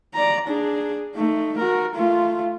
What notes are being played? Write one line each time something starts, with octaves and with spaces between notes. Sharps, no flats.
D5 A#5
D4 G#4
A3 D#4
F#4 A#4
A3 F4